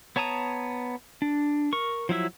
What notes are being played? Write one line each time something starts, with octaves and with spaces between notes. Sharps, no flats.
B3 C#5 A5 A#5 D#6
D4
A#4 C#6
F3 F#3 E4 E5